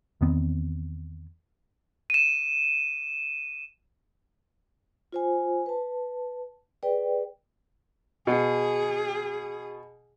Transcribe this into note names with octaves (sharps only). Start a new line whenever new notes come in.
E2 D#3 B3 C4
D#7 E7
F4 C5 G#5
B4 A5
G#4 B4 D5 G5
B2 G#4